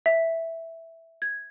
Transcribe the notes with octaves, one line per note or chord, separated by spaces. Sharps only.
E5
G#6